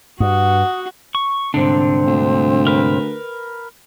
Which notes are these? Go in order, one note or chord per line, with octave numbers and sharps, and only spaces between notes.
G2 F#4 F#5 D#6
C#6
C2 G#2 D3 C4 D4
D2
A#4 B4